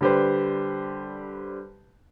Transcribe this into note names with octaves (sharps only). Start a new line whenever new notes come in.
D3 G3 G4 B4 C5